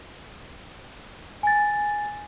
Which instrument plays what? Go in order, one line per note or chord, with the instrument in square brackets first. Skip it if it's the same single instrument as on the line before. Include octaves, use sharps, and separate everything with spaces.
[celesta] G#5 A6